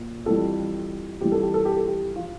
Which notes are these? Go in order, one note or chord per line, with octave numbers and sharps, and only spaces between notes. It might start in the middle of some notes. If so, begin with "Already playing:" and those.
Already playing: A#2
F2 E3 G3 A4
F2 E3 G3 G4
A4
G4
A4
G4
A4
G4
F3 F4